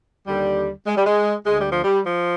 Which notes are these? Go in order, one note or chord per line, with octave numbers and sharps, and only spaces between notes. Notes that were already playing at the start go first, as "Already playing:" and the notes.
D#2 D3 G3
G#3
G3
G#3
D2 D3 G#3
G3
F3
G3
F3